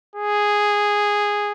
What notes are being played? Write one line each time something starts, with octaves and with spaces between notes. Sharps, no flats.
G#4